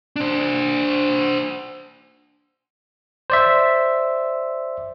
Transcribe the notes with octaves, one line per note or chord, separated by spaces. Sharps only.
D4 C5
C5 D5 E5